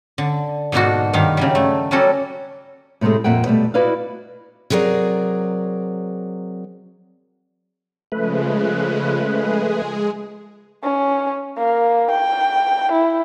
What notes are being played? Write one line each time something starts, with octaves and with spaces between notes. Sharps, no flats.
D3
G#2 B2 A#3 D4 D#4 F#4
G2 D#3 D#4 F5
C#3 F#3 G3
A3
F#3 G3 A#3 C#4 F#4 A4
A2 C3 F#3 G#3 A3
F2 A#2 E5 F#5 G5
B2 G3 A3
E4 F#4 B4 D5 D#5 F5
C3 F#3 G#4 A#4 D5
C#3 F3 G#3 A3 B4
G#3 G#4
C#4
A#3
G5
E4